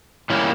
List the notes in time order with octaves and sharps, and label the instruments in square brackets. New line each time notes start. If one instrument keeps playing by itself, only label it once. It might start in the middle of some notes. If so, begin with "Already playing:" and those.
[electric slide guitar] E3 G3 A#3 C#4